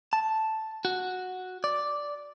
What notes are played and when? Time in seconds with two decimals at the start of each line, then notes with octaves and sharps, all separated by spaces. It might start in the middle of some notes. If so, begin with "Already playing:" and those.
0.13 A5
0.85 F#4
1.64 D5